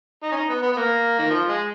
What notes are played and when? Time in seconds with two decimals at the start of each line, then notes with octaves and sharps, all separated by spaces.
0.23 D#4
0.32 C#4
0.36 D#4
0.49 B3
0.63 B3
0.73 B3
0.76 A#3
1.19 D#3
1.30 F3
1.48 G#3